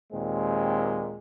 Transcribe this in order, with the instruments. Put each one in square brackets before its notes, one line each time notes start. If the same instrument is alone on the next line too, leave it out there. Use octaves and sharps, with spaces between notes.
[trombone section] D#2 A#2 G#3 C4